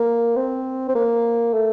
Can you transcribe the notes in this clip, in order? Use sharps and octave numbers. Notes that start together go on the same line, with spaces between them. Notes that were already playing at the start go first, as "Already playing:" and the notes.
Already playing: A#3
C4
C4
A#3
A3